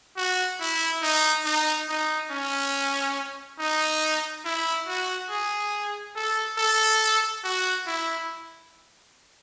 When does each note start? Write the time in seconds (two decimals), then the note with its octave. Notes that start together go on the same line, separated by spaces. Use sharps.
0.17 F#4
0.61 E4
1.03 D#4
1.45 D#4
1.89 D#4
2.31 C#4
3.59 D#4
4.45 E4
4.87 F#4
5.30 G#4
6.16 A4
6.58 A4
7.44 F#4
7.87 E4